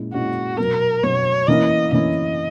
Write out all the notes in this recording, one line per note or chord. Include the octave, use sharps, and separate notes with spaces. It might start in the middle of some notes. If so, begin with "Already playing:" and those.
Already playing: A#2 G#3 C#4 E4
A#2 G#3 C#4 E4 F#4
B2 F#3 B3 A#4
B2 F#3 B3 C#5
E3 A#3 C#4 E4 D#5
E3 A#3 C#4 E4 D#5